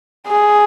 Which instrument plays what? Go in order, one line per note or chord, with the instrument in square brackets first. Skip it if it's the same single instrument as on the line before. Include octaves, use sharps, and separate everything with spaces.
[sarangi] G#4